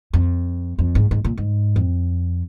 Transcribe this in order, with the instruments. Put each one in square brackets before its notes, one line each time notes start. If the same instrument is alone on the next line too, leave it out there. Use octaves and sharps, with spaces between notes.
[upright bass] F2
F2
G#2
G#2
A#2
G#2
F2